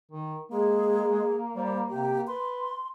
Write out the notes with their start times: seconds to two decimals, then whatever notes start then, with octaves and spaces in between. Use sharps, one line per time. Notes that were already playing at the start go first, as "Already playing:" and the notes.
0.12 D#3
0.52 G#3 A#3 G#4
1.56 G3 C5
1.89 C3 G4
2.27 B4 C6